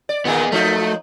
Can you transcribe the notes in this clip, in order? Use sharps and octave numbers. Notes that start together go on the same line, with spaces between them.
D5
A#2 D#3 A#3 B3 G#4
F3 A3 A#3 D#4